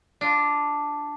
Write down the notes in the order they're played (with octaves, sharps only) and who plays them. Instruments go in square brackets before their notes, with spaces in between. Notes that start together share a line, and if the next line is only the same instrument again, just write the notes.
[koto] D4 F4